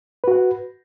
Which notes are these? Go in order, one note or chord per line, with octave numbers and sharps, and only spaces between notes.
F#4 B4 F#5